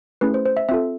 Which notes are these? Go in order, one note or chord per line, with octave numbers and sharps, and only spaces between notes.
A3 C#4 E4 G#4 B4
C5
C5
E5
C4 F4 A4 E5